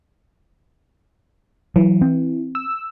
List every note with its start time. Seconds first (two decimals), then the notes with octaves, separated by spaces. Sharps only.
1.76 E3 F#3
2.01 C4
2.55 E6